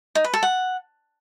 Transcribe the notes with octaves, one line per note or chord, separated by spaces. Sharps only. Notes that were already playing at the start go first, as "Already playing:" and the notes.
D#4
B4
A4
F#5